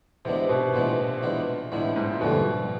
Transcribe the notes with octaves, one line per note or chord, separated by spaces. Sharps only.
C3 E3 G#3 B3 D4
B2
A#2 E3 G#3 B3 D4
E3 G#3 B3 D4
A2 E3 G#3 B3 D4
A2
G#2
A#2
F2 B2 D3 G3 A#3